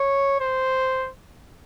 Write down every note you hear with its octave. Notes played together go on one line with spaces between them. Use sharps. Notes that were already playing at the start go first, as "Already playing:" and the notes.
Already playing: C#5
C5